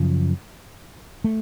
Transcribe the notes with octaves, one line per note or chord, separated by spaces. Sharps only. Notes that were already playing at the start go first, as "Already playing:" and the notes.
Already playing: F#2 C#3 F3
A3